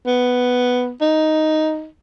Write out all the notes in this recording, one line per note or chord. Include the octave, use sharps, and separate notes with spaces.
B3
D#4